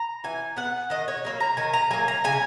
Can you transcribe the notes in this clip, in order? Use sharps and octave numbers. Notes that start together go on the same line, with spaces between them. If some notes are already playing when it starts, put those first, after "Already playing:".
Already playing: A#5
E3 G#5
B3 F#5
D#3 D#5
C#5
F#3 A#3
A#5
D#3 G#5
A#5
F#3 A#3 G#5
A#5
C#3 G#5